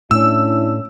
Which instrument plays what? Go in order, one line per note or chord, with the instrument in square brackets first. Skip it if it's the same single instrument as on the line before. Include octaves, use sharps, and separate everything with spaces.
[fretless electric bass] A2 [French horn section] C#4 D4 E4 [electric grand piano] E6